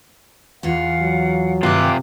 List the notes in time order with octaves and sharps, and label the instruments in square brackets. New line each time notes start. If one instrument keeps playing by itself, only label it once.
[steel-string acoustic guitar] E2 E3 F4 [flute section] F5 F#5
[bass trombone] F#3
[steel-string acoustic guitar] G2 D#3 C#5 [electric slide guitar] C3 F4 [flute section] G5 D6 F#6